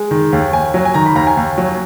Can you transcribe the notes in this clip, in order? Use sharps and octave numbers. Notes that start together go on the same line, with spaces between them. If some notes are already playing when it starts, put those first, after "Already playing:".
Already playing: G#3
D#3
D#2
D#2 G#5
F#3
G#5
D#3 A#5
B5
D#2 A#5
G#5
D#2
F#3